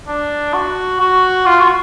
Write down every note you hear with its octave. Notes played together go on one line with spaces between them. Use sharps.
D4
F#4
F#4
F4
F#4